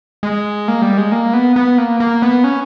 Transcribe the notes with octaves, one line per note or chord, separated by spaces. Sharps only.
G#3
A#3
G3
G#3
A#3
B3
B3
A#3
A#3
B3
C#4